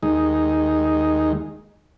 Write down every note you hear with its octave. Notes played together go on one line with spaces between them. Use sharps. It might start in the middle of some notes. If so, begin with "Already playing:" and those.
D#2 G#3 D#4